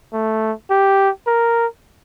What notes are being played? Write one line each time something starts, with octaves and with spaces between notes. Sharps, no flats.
A3
G4
A#4